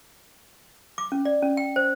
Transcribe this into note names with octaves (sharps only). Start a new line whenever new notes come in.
D6
C#4
D5
C#4
G5
C5